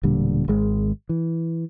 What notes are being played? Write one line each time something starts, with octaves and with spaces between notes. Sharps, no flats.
E1 A#2 D3 G3
G#1 G#3
E3